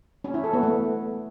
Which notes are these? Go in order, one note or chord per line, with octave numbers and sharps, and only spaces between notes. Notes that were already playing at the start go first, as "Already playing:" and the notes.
C#4
E4
A4
B3
A3